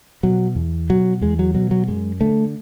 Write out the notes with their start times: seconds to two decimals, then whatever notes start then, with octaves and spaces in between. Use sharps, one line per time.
0.23 B2 F#3
0.55 E2
0.89 B2 F#3
1.21 E2 G#3
1.39 F#3
1.54 B2 F#3
1.71 F#3
1.88 F#2 G#3
2.21 D3 A3